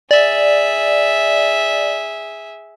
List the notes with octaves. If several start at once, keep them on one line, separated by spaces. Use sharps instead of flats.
G#4 D5 E5